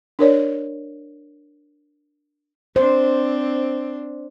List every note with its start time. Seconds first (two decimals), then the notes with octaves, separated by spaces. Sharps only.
0.19 D4 A#4 C#5 D5
2.76 C4 D4 C5